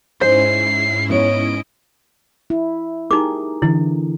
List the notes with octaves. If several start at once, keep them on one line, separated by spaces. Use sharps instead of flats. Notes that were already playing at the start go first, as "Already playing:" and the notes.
G#2 C#4 D#4 E4 G#4 C5 C7
B3 C#5 D#5 D7
E4
D#4 G4 G#4 A#4 D6
D3 E3 E4